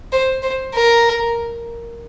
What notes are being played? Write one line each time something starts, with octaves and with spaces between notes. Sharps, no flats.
C5
C5
A#4